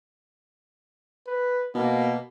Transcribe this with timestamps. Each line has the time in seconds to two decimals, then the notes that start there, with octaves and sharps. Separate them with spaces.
1.27 B4
1.75 B2 A#3